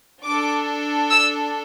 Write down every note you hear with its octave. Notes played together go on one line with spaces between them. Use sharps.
D4 A4 D6
E6